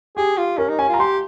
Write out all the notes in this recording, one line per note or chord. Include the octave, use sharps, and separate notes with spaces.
G4 G#4
F4
C#4 A#4
D#4
C#4 G#5
F4
A#5
G4 C6